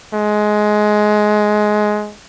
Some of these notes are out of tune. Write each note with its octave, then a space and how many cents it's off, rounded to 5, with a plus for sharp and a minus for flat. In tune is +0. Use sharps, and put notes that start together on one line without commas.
G#3 +15